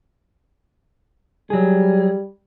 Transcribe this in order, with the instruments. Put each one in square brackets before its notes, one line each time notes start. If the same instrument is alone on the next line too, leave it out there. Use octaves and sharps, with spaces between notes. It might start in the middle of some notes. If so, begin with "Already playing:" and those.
[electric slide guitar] F#3 G#4 [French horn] G3